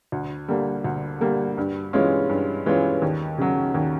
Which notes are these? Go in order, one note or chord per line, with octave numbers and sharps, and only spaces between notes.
D2
D3 G3 A#3
D2
D3 G3 A#3
G2
E3 G#3 C#4 F4
G2
E3 G#3 C#4 F4
D#2
C#3 F#3
D#2